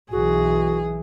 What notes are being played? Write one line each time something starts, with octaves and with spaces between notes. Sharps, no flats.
B1 E3 F#4 G#4